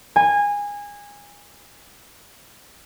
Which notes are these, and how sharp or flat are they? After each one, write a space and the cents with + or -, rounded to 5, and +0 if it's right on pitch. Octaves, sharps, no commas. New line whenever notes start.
G#5 -20